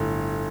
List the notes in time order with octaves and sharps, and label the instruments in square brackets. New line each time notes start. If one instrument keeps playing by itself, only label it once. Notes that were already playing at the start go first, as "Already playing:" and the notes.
Already playing: [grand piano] G1 A2